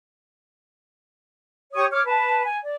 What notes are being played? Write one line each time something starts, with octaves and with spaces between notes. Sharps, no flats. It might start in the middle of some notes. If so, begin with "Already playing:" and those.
G4 C#5 C#6 D#6
C#5 D6 F6
B4 A5
G#5
D5